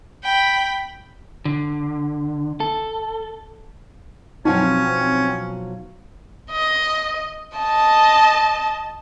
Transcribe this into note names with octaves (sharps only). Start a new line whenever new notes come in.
G5 B5
D3
A4
B2 F3 F#3 C4 C#4 D#4
D#5
D#5 A5